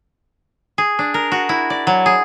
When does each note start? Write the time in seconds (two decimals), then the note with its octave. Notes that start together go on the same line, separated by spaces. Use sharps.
0.78 G#4
0.99 D4
1.14 A#4
1.32 F#4
1.49 E4
1.70 D5
1.87 F#3
2.06 G#4